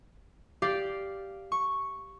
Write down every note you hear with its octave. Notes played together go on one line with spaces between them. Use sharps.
G4 D5 F5
C#6